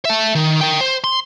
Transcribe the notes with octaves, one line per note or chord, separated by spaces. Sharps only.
E5 A5
D#3
A#4 G5
C5
C6